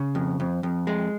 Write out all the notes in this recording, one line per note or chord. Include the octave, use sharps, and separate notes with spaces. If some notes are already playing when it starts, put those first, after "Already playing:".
Already playing: C#3
F2
F2
F2
G#3